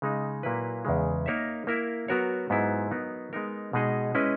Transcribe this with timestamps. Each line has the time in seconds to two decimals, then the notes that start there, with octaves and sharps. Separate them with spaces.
0.02 C#3 G#3 D#4
0.43 A#2 F#3 A#3 E4 B4
0.85 E2 C#3 G#3
1.26 A#3 D#4 A#4 C#5 E5
1.67 A#3 E4 A#4 E5
2.08 F#3 B3 F#4 A#4 C#5
2.50 G#2 F#3 B3 E4 G#4
2.91 F#3 B3 D#4 A#4
3.33 G#3 B3 D#4 A#4
3.73 B2 G#3 D#4 G#4 D#5
4.15 G#3 C#4 E4 B4 D#5